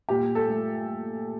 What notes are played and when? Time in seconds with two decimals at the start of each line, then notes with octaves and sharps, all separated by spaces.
0.09 A#2 G4
0.35 A4
0.49 A3